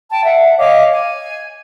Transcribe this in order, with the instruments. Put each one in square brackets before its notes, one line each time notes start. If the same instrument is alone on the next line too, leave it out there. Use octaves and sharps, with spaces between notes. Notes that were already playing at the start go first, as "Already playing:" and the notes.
[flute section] G5 A5
E5 F#5
C#5 D#5 F5 D6
G#5